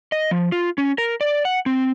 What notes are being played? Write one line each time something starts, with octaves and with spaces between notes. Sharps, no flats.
D#5
F3
F4
C#4
A#4
D5
F#5
C4